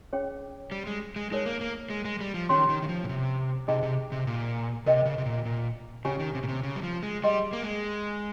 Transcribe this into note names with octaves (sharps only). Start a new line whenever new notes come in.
C#4 G#4 C#5 G5
G3
G#3
G#3
G#3 D#4 A#4 C#5
A#3
A#3
G#3
G#3
G3
F3
D#3 C#4 G4 C#5 G5 C6
D#3
D#3
F3
A#2
C3
C3 D#4 G#4 D#5 G5 A#5
C3
C3
A#2
C3 A#4 D#5 G5
C#3
C3
A#2
A#2
C#3 C#4 G4 C#5 G#5
D#3
C3
A#2
C3
C#3
G3
F3
G#3
G3 G#4 D#5 G5 C6
A#3
G#3